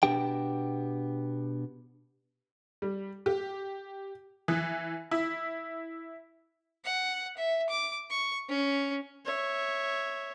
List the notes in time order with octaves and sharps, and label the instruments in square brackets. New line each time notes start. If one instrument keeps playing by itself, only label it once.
[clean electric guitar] B2 B3 D4 G4 G5
[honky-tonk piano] G3
G4
E3
E4
[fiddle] F#5
E5
D6
C#6
C#4
[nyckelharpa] C#5 E5